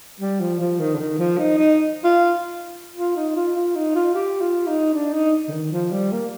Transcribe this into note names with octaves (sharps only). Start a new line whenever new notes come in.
G3
F3
F3
D#3
D3
D#3
F3
D#4
D#4
F4
F4
D#4
F4
F4
D#4
F4
G4
F4
D#4
D4
D#4
D3
D#3
F3
G3
A#3